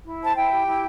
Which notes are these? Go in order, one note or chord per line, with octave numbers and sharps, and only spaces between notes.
E4
C5 A5
E4 G5
G4
E4